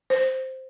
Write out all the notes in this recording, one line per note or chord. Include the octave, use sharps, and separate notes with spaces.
C5